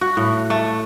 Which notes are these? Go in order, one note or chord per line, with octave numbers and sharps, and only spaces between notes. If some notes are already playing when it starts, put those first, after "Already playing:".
F#4
A2
A3